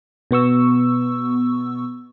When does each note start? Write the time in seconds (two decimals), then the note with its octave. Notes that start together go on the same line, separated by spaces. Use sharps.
0.31 B2 B3 C#6 E6